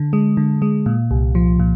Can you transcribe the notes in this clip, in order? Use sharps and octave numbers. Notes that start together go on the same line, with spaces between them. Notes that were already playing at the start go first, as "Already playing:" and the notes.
Already playing: D3
G#3
D3
G#3
A#2
C2
F3
A#2